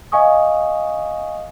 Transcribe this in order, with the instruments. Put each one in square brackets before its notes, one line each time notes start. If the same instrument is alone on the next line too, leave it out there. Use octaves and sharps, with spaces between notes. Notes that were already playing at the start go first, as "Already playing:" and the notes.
[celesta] D#5 F5 G#5 C#6 D#6